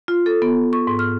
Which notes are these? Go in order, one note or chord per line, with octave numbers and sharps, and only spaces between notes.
F4
A4
B3
C#6
G#2
F6